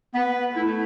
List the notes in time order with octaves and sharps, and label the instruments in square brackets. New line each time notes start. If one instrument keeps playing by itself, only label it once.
[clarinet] B3 [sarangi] B4
[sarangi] A3 [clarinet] E4